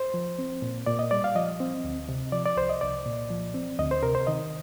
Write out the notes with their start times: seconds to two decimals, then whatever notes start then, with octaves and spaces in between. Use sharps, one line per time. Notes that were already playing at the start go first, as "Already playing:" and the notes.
Already playing: C5
0.14 F3
0.39 C4
0.62 A#2
0.86 A#2 D5
0.99 D#5
1.11 G3 D5
1.24 F5
1.35 F3 D#5
1.60 C4
1.84 D2
2.09 C3
2.32 F3 D5
2.46 D5
2.57 C2 C5
2.70 D#5
2.81 C2 D5
3.06 A#2
3.30 F3
3.54 C4
3.79 D2 D#5
3.91 C5
4.02 C3 A#4
4.15 C5
4.27 D#3 D#5